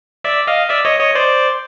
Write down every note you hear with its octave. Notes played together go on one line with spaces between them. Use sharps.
D5 E5
D#5 F5
D5 E5
C#5 D#5
C#5 D#5
C5 D5